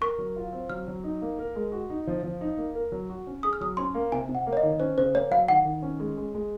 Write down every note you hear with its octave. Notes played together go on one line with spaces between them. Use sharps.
A#4 C#6
F#3
F4
C4
F#3 F6
F#3
D#4
A#3
A#4
G#3
F#4
D#4
F3
F3
D#4
A#3
A#4
F#3
F#4
C#4
G#4 D#6
F6
F#3 D#6
C#4 C6
A#3
C3 G#5
C3
F#5
A#3
C#5
D#5
D#3
C#4 C5
C#3 C5
A#3 C#5
F#3 F5
D#3 F#5
D#3
C#4
G#3
G#3
G#3